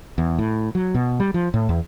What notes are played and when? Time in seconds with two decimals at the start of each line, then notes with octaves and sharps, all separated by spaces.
0.18 E2
0.39 A2
0.75 F#3
0.95 B2
1.20 G3
1.34 F3
1.54 A2
1.69 E2